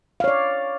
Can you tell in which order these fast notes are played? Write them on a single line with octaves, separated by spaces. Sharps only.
F5 C#5 D5